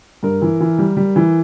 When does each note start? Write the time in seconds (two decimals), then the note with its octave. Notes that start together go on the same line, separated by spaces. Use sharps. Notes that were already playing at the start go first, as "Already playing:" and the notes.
0.23 G2 A#4
0.42 E3
0.60 E3
0.78 G3
0.97 G3
1.16 E3